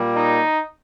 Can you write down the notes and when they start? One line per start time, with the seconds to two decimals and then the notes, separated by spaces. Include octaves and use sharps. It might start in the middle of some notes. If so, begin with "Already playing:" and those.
Already playing: A#2 G3 A#3
0.16 D#4